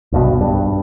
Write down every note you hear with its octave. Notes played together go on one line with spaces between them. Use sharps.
C2 G2 B2
G2